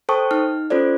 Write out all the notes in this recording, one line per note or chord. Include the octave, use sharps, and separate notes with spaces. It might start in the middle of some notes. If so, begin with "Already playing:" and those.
A4 C5 G5 A5 C#6 D#6
D#4 F6
C#4 F4 A4 C5 D5